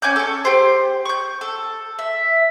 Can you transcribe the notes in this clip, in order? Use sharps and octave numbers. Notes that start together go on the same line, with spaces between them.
C#4 G#5 D6 G6
A4 C#6
G4 C5
C#6 G6
A4
E5